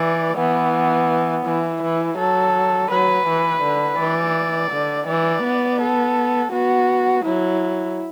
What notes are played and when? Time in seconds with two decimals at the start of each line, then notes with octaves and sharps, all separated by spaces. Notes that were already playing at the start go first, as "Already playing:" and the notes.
Already playing: E3 D5
0.37 E3 B3
1.46 E3 E4
1.82 E3
2.18 F#3 A4
2.91 F#3 B4
3.27 E3
3.63 D3
3.99 E3 D5
4.71 D3
5.07 E3 D5
5.44 B3
5.80 A4
6.52 B3 F#4
7.25 F#3 E4